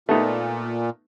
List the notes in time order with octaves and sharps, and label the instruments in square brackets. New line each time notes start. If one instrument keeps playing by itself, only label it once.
[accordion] A#2 [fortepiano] A3 B3 D#4